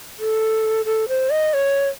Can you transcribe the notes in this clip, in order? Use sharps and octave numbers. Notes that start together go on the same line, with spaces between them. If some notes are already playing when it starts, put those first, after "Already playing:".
A4
A4
C5
D#5
C#5